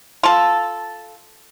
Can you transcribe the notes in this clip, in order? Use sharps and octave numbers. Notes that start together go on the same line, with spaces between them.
F4 A4